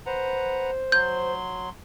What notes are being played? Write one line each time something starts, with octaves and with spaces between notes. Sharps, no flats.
B4 C5 F#5 A#5
F#3 C6 G6